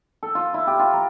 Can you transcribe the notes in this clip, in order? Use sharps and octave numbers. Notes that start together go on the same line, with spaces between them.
A4
F4
E4
G4
F4
A#5